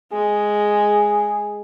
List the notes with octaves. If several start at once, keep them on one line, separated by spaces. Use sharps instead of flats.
G#3 G#4